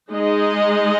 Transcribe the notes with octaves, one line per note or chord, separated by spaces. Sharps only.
G#3 D#4 G#4 D#5